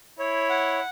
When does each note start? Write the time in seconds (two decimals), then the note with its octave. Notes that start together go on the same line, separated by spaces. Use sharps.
0.19 E4 C#5
0.50 F#5